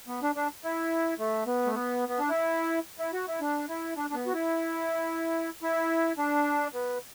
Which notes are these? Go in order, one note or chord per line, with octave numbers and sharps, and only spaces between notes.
B3
D4
D4
E4
A3
B3
A3
B3
B3
D4
E4
E4
F#4
E4
D4
E4
D4
D4
B3
F#4
E4
E4
D4
B3